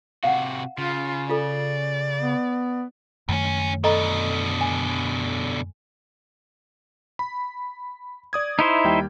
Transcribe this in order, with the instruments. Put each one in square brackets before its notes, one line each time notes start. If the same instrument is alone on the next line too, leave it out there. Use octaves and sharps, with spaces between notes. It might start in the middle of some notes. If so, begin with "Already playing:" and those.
[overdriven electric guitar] C3 F#4 [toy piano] F5 F#5
[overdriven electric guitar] C#3 [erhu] F4
[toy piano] F4 A4 [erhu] D5
[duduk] B3
[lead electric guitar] C#2 C#4 [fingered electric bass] F#2 D#3 A3
[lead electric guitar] B2 D3 [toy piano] A4 D#5 A#5
[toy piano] G#5
[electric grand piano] B5
D5 D#6 G#6
[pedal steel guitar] D#4 E4 C5 [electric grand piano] E5
[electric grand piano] D#2 G3 G5